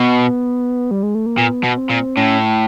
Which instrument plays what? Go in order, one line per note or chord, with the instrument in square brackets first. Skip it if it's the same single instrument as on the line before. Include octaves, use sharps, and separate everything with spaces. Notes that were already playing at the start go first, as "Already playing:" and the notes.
Already playing: [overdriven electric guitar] B2 [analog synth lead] B3
[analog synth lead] G3
G#3
A3
A#3
[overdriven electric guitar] A#2 [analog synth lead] B3
[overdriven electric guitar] B2
[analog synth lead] C4
[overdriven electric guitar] A#2
[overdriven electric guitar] A2 [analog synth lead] C#4